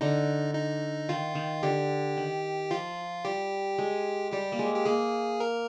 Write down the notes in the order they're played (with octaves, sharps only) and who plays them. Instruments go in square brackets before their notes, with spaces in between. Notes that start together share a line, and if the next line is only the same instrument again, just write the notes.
[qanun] D3 [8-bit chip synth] D#4
[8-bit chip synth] D#4
[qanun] D#3 [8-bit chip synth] F4
[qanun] D#3
[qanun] D3 [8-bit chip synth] G4
[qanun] D#3
[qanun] F3 [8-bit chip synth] F4
[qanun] G3 [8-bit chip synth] G4
[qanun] G#3
[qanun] G3 [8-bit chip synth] G4
[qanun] A#3
G#3
[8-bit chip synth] G4
[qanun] A#3 [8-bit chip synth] G#4
[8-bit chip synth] A#4